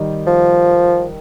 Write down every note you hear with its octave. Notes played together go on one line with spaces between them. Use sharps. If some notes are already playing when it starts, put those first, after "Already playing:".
Already playing: D#3 G3 D#4
F3